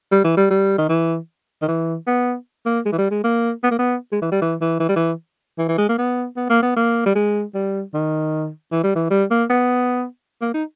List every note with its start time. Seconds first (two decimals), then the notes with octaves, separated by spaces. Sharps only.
0.12 G3
0.24 E3
0.37 G3
0.50 G3
0.78 D#3
0.89 E3
1.62 D#3
1.68 E3
2.07 B3
2.66 A#3
2.85 G#3
2.92 E3
2.98 G3
3.11 G#3
3.24 A#3
3.63 B3
3.71 A#3
3.79 B3
4.12 G#3
4.22 E3
4.32 G3
4.42 E3
4.61 E3
4.80 E3
4.89 G3
4.96 E3
5.58 E3
5.69 E3
5.78 G#3
5.89 A#3
5.98 B3
6.37 B3
6.50 A#3
6.62 B3
6.76 A#3
7.06 G3
7.15 G#3
7.55 G3
7.94 D#3
8.72 E3
8.83 G3
8.95 E3
9.10 G3
9.31 A#3
9.50 B3
10.42 A#3
10.54 D#4